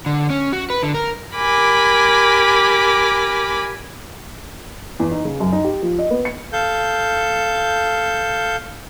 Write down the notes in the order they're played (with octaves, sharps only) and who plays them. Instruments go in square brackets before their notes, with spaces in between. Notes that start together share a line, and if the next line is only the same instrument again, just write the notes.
[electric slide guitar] D3
C#4
F#4
B4
D3
A#4
[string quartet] G4 A#4 G#5 B5 D6
[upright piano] E2
D#4
C#3
F#2
D#4
G4
F3
D#5
B3
C#7
[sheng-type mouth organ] A4 F5 G6